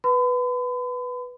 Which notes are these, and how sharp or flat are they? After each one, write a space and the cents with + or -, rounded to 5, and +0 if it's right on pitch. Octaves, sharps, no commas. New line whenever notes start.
B4 +0 B5 +45